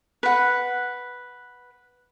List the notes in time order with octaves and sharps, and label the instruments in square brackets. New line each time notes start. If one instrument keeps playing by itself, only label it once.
[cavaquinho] B4 F#5